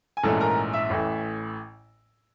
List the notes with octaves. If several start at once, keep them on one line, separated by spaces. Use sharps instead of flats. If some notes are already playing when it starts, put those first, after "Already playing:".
G#5
A#1 G#2 E3 A3 C#4 A4 A5
A#4 A#5
E5 E6
A1 A2 E3